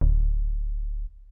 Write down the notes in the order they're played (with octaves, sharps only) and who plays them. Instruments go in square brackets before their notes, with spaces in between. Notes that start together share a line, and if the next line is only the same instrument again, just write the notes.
[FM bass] D1